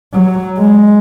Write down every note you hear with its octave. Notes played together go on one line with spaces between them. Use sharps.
F#3
G#3